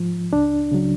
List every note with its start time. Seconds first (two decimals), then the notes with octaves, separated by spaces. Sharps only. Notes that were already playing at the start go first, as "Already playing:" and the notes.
Already playing: G#2 F3
0.33 C#2 D4
0.72 C#3 F#3